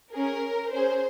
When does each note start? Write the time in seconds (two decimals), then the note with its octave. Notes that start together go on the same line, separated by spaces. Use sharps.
0.13 C#4 G#4 A#4
0.72 C#4 G#4 C5